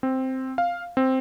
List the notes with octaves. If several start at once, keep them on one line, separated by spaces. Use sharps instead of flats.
C4
F5
C4